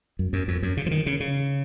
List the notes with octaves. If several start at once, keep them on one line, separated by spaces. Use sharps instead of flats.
F#2
F#2
F2
F#2
C#3
F3
D#3
C#3
C#3